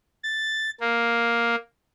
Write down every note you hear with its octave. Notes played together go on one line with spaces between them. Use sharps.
A6
A#3